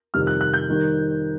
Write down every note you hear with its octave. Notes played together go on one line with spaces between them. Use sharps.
F2 C3 D#3 G3 F6
F#6
F#6
G6
D#3 G3